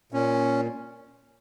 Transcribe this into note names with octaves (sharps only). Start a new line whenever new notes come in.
A#2 C#4